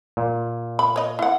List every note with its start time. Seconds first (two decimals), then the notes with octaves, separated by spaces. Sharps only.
0.17 A#2
0.79 B5
0.96 C#5 D#5
1.19 E4 F#5